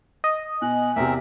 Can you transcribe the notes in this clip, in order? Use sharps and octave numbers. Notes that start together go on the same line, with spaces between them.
D#5
B2 G#5 F#6
E2 C3 C4 A#4 E5